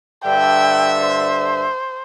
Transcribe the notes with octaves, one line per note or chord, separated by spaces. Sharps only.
G2 D3 E5 G5
C5